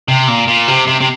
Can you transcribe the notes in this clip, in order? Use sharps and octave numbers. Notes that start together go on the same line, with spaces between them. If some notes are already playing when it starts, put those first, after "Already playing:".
C3
A#2
A#2
C3
C3
C3